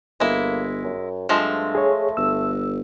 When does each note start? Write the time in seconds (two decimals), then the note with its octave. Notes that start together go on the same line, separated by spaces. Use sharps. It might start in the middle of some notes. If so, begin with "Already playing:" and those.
0.20 G1 G#3 A#3 E4
0.84 F#2
1.29 G2 F3 G#3 A3 C4
1.75 G#4 C#5
2.17 G1 E6